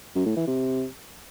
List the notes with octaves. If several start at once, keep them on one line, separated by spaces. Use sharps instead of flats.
F#2
A2
E3
C3